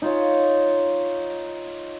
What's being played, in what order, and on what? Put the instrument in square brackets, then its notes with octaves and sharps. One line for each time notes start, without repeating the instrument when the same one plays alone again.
[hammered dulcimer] D#4 F4 C#5